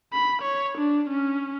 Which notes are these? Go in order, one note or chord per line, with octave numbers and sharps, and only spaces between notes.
B5
C#5
D4
C#4